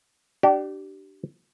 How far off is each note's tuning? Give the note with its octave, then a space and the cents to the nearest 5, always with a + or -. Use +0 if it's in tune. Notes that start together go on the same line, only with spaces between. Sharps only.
D4 +10 G4 -30